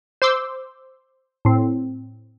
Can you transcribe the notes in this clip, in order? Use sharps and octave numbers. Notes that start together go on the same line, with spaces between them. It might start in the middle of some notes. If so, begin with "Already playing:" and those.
C5 C6 D6 E6
A2 C4